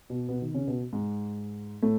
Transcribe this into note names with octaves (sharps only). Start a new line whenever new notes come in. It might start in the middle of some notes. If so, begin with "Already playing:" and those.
B2 B3
B2 B3
D#3 D#4
C#3 C#4
B2 B3
G#2 G#3
A2 A3